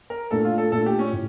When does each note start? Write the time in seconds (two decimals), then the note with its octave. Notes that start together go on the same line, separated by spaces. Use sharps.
0.10 A#4
0.31 A#2 A3 D4 A4
0.45 F4
0.58 A4
0.72 A#2 A3 D4 A4
0.86 G4
0.99 C#4
1.13 A2